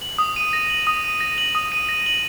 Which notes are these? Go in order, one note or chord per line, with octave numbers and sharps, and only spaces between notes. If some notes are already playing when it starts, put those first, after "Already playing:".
F#7
D#6
D#7
A#6
F#7
D#6
D#7
A#6
F#7
D#6
D#7
A#6
F#7